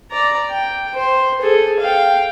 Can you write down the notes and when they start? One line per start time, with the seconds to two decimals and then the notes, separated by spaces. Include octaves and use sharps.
0.11 D5 A#5
0.51 G5
0.94 C5
1.41 G#4 A4
1.80 F5 G5